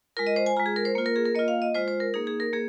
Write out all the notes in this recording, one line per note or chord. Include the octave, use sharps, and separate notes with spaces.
G#3 F4 A#4
D#5
C5
G#5
G#3 F4 A#5
G#4
A#4
C5
A#3 F4
A#4
G#4
A#4
A#3 F4 D#5
F5
D#5
G#3 F4 C5
C5
A#4
A#3 D#4 G#4
G#4
A#4
A#3 G#4